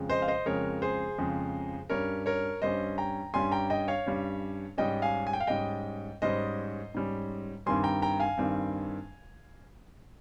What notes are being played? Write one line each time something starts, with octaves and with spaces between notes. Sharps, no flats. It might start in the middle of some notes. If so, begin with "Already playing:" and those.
Already playing: F2 C#3 G#3
C5 D#5
F5
C5 D#5
F2 C#3 G#3 A#4 C#5
G#4 C5
F2 C#3 G#3
G2 G3 C#4 A#4 C#5
A#4 C#5
G2 G3 C#4 C5 D#5
G5 A#5
G2 G3 C#4 G#5 C6
G5 A#5
D#5 G5
C#5 F5
G2 G3 C#4
G#2 G3 C#4 D#5 G5
F5 G#5
G#5
G5
F5
G#2 G3 C#4 D#5 G5
G#2 G3 C#4 C5 D#5
G#2 G3 C#4
G2 D#3 G3 C4 G#5 C6
G5 A#5
G5 A#5
F5 G#5
G2 D#3 G3 C4